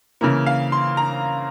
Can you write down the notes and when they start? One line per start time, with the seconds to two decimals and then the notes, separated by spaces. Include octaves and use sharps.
0.21 C#3 E3 A#3 A#4
0.46 F5
0.72 C6
0.97 A#5